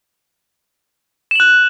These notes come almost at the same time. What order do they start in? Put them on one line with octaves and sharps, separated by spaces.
E7 F#7 F#6